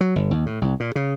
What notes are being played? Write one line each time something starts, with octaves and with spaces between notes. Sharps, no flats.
F#3
G1
D#2
A2
C2
A#2
C#3